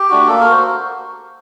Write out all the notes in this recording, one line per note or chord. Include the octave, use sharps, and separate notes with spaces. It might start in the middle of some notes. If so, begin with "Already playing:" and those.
Already playing: G4
A3 D4 F#4
A#3 A4
A#4
F#4
C5